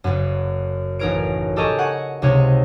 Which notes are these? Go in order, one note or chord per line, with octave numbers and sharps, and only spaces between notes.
F#1 F#2
A1 D#4 A#4 C#5 D7
G4 A4 A#4 D#5 G#5 C#6
F#5 G#5 C#6
C#2 C3 D#4 C#5